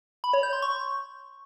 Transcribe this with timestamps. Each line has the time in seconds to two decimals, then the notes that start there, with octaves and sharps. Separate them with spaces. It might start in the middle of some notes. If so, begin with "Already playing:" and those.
0.24 B5
0.33 C#5
0.43 G6
0.53 C6
0.62 C#6